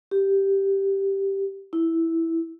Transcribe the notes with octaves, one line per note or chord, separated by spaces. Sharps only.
G4
E4